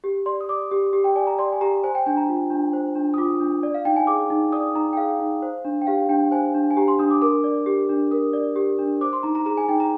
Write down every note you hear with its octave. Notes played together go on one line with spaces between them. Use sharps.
G4
D5 C6
D#6
D5 D6
G4
G4
G5
D5 G#5
A#5
D5 C6
G#5
G4 A#5
C5 G#5
G5
D4 G#5
A#5
F4
D4
C5
D4
D#6
F4 D6
D4
D5
F5
D#4 G5
G#5
G#4 D6
D#4
D5 D#6
D#4 A#5
G5
G#4 F5
D#4
C5
D4
G5
G4 F5
D4 G5
C5 G#5
D4
G#5
G4 A#5
C6
D4 D#6
D6
A#4 D6
D5
G4
D4
A#4 D#6
D5
G4
D4
C5 D6
C6
D#4 A#5
A#5
G#4 A#5
G#5
D#4 G5
A#5